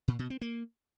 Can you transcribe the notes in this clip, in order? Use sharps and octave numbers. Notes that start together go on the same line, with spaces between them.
A#2
B2
C4
A#3